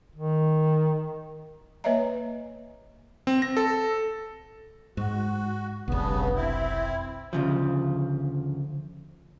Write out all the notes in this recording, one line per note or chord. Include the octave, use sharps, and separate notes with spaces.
D#3
A#3 B4 C#5 D#5 E5 A#5
C4
A#6
A4
G#2 F#4
F1 B1 G2 C#3 B3
C4 E4
D2 C#3 F3